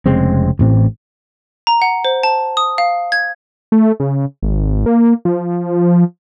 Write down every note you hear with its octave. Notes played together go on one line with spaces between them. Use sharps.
F1 C#3 G#3 C4
A1 A2 C4
A#5
F#5
C5
A5
D#6
F5
G#6
A3
C#3
G#1
A#3
F3